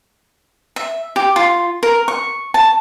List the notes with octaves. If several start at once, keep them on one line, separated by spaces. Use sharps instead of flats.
E5
G4
F4
A#4
C#6
A5